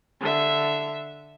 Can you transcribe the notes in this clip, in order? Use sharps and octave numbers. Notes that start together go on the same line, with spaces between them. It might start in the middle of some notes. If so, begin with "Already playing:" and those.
D3 E5